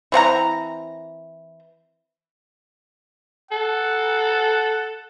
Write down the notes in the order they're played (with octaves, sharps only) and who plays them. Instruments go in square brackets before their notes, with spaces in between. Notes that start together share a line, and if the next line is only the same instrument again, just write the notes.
[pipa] E3 C4 F#5 A#5
[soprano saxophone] A4 [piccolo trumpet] F#5